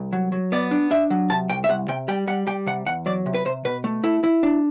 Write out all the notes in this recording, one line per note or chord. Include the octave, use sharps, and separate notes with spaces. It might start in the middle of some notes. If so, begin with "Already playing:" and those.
Already playing: C2
F#3
F#3
B3 D5
D4
D4 E5
F#3
C3 A5
C2 G5
E5
C2 F#5
C3 G5
G3 G5
G3 F#5
G3 G5
C3 F#5
E2 F#5
F#3 D5
C3
B4
C3 C5
B2 B4
A3
E4 A4
E4
D4